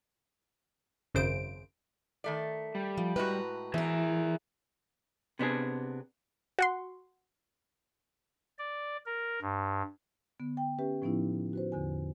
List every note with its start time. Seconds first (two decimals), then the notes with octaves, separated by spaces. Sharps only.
1.14 G#1 F#2 C#3 C5 D7
2.24 D#3 A3 D5
2.75 G3
2.98 F3
3.16 A2 G#3 F#4 B4 A#5
3.74 E3 G#4 A#4 E5
5.39 C3 B3 D4 G#4
6.59 F#4 F#5 C6
8.59 D5
9.06 A#4
9.42 G2
10.40 D3 B3
10.57 G5
10.79 C#4 G4 B4 E5
11.02 A2 F3 B3 C#4 D#4 E4
11.53 F#4 B4 C5
11.72 E2 D3 G#5